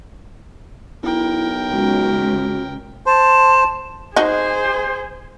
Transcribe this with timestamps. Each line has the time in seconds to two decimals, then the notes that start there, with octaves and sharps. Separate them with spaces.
1.03 B1 E4 A#4 G5
1.71 C#2 F#4
3.06 C5 A5
4.16 D#4 F#4 G#4 C5